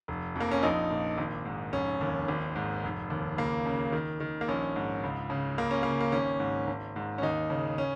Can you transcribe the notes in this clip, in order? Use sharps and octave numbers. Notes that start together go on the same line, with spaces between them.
F1
F2
A#3
C#4
A#1 D#4
A#2
G#1
G#2
F1 C#4
D#2
G#1
G#2
F1
D#2
C#2 A#3
C#3
D#3
D#3
A#3
A#1 C#4
G#2
C#2
C#3
C#2 A#3
C#4
C#3 A#3
A#3
G#1 C#4
G#2
G#1
G#2
C#4
D#2 D#4
C#3
C#4